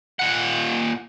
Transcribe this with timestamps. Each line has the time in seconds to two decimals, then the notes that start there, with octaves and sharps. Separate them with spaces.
0.19 A#2 F#5